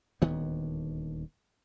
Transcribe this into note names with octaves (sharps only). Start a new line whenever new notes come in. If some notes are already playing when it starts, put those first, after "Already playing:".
D#1 D2 D#3 B3